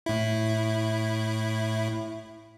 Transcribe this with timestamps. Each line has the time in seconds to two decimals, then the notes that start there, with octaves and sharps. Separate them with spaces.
0.06 A2 E4